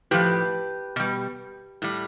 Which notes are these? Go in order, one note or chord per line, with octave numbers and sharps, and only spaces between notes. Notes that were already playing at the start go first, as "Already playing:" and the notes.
A2 F3 G4 B4
B2 G3
A2 G3